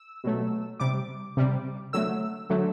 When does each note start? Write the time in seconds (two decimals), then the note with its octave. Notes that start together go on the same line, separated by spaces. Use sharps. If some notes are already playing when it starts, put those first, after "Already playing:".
Already playing: E6
0.24 B2 F#3 A3
0.80 C3 G3 D6
1.37 C3 G3
1.93 D3 F#3 A3 E6
2.50 D3 F#3 A3